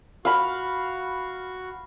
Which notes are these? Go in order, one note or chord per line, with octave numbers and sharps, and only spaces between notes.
F#4 F5 B5